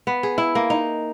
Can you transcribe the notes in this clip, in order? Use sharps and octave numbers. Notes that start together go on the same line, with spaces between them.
B3
G#4
E4
A#3
D#4